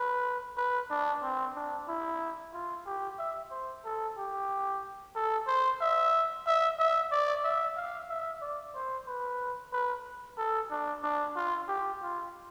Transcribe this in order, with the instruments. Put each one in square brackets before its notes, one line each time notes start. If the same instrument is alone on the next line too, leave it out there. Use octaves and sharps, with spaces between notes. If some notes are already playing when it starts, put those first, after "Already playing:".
Already playing: [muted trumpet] B4
B4
D4
C4
D4
E4
F4
G4
E5
C5
A4
G4
A4
C5
E5
E5
E5
D5
E5
F5
E5
D5
C5
B4
B4
A4
D4
D4
F4
G4
F4